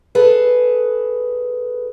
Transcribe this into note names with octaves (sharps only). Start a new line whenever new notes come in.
G#4 A4 B4